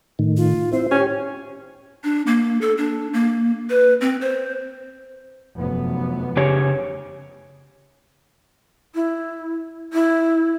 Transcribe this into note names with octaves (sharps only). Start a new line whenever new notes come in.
A2 D#3
F4
C4 E4 C5
C#4 G4 C#5
D4
A#3
A4
D4
A#3
B4
C4
C5
F1 F#2 B3
C#3 G4 C#5
E4
E4